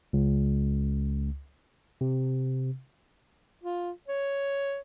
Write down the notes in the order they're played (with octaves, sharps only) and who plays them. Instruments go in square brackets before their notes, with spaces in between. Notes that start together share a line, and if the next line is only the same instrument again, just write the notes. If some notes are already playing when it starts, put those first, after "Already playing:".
[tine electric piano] C#2
C3
[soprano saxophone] F4
C#5